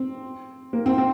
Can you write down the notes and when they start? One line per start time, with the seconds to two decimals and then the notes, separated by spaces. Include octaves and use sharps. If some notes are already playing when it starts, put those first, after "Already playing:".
Already playing: C4
0.73 A#3
0.86 C4
0.98 C4